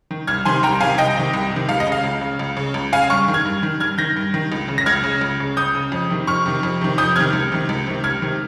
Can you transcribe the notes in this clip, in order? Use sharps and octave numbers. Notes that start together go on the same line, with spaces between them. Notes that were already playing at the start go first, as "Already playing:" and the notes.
D#3
C2 F6 G#6
C3 D#3 G#5 C6
C2 G5 A#5
C3 D#3 F5 G#5
C2 D#5 G5
C3 D#3
C2
C3 D#3
C#2 F5
D#5
C#3 F5
C#2
C#3
C#2
C#3
C#2
C#3 F5 G#5
G2 C#6 F6
D#3
F6 G#6
G2
D#3
G2 F6 G#6
D#3 G6 A#6
G2
D#3
C#2
C#3
A#6
C#2 F6 G#6
C#3
C#2
C#3
C#2 D#6 G6
C#3
F2
C3 D#3
F2 C#6 F6
C3 D#3
F2
C3 D#3
F2 D#6 G6
C3 D#3 F6 G#6
C#2
C3 D#3
C#2
C3 D#3
C#2 F6 G#6
C3 D#3